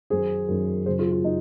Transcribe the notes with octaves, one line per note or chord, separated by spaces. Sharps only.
F#2 D#3 F#3 G#4 C5
F#2 D#3 F#3
F#2 C#3 F#3 G#4 C5
F4 G#4
F4
F#3 D#4